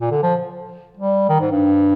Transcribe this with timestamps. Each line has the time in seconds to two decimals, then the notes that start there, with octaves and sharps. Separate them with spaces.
0.01 A#2
0.11 D3
0.23 F3
0.97 G3
1.29 D#3
1.40 G#2
1.51 G2